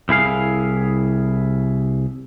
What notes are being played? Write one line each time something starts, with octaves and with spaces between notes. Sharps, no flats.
C2 E4 G#4 F5